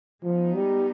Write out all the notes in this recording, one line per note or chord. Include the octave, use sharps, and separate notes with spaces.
F3 G#3 B3 D#4
G3